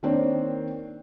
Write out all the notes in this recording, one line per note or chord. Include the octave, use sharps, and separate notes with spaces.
D#3 A#3 C4 D4 C5 C#5